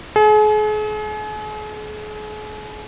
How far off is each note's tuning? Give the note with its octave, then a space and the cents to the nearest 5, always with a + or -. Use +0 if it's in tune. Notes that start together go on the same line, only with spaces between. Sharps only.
G#4 +40